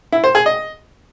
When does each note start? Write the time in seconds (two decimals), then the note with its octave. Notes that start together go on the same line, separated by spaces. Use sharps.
0.12 E4
0.24 C5
0.35 G#4
0.46 D#5